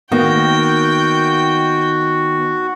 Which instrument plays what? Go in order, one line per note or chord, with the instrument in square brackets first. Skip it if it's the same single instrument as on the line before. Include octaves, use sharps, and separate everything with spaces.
[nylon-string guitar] D#3 A#3 [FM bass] B3 [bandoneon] F#4 [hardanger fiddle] G5